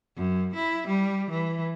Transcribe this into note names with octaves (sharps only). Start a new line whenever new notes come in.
F#2
E4
G3
E3